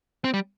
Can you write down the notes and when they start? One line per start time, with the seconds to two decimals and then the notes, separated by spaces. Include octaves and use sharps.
0.24 C4
0.34 G3